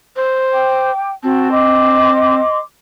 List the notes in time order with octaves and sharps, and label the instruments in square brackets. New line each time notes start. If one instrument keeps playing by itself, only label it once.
[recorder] C5
[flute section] G5 D6
[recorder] C4 [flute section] F#4 A5
[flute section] D#5 C6 D6